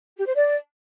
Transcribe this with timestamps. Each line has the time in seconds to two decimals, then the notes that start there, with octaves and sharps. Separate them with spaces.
0.18 G4
0.27 C5
0.35 D5